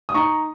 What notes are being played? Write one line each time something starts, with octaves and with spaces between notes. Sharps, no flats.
D#6
D#4 A#5 C#6